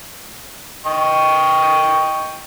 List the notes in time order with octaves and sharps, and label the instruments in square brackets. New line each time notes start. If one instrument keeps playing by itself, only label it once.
[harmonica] D#5 G5 C#6